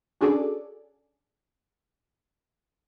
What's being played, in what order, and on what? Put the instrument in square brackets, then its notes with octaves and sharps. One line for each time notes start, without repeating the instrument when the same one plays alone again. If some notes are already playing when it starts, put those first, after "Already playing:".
[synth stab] C#4 D4 F#4 G#4 A4 D5